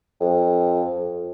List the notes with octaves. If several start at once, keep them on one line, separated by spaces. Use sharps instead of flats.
F2